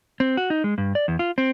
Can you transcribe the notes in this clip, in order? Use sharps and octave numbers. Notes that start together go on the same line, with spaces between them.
C4
F#4
D#4
G#3
G2
D5
E2
F4
C4